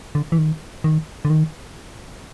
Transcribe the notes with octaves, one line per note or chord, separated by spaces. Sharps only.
D3
E3
D#3
D#3
D3
D#3